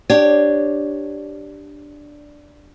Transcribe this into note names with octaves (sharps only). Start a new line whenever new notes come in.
D4 G4 C#5